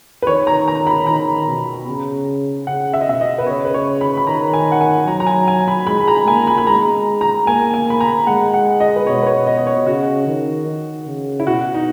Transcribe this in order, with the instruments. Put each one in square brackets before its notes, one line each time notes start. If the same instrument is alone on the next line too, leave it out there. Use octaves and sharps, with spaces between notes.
[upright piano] B4
[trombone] D#3 [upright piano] C#5
[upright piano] A#5
A#5
B5
[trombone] D#3 [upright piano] A#5
[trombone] B2
C#3
[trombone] C#3 [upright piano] F#5
[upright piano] E5
D#5
[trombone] B2 [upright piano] E5
[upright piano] D#5
B4
[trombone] C#3 [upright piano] C#5
[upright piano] B4
C#5
B5
B5
[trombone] D#3 [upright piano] A#5
[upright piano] G#5
F#5
G#5
[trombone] F#3 [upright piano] A#5
[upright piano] A#5
G#5
G#5
B5
[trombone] G#3 [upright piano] B5
[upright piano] A#5
[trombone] A#3 [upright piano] G#5
[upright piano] B5
B5
[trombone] G#3 [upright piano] A#5
[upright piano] A#5
[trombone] A#3 [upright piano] G#5
[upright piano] G#5
B5
A#5
[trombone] G#3 [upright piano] F#5
[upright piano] F#5
D#5
B4
[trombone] B2 [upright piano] C#5
[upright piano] B4
C#5
D#5
D#5
C#5
[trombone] C#3 [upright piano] F#4
[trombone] D#3
D#3
C#3
[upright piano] E4
[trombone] B2 [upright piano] F#4
[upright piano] D#4